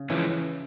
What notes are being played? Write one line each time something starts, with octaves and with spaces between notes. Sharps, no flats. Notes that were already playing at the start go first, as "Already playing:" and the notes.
Already playing: C#3
E3 F3 G#3 C#4